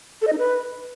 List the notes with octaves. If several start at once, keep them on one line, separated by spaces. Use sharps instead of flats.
A4
D#5
D#4
B4